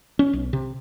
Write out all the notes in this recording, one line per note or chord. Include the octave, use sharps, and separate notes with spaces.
C#4
B1
C3